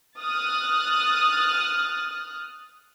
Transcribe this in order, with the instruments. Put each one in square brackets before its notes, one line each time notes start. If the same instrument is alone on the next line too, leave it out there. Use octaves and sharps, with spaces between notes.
[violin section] D#6 F6 F#6 A6